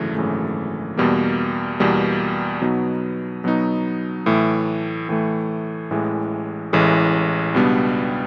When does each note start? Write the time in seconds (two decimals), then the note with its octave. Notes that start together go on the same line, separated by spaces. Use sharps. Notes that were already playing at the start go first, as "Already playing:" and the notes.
Already playing: G#1 F#2 C#3 E3 A3
0.15 G#1 F#2 C#3 E3 A3
0.97 E2 B2 G3 A#3
1.80 E2 B2 G3 A#3
2.61 B2 F#3 B3 D#4
3.44 B2 F#3 B3 D#4
4.26 A2 E3 A3
5.09 A2 E3 A3
5.90 A1 A2 E3 G#3
6.73 A1 A2 E3 G#3
7.55 C#2 B2 G3 B3 D4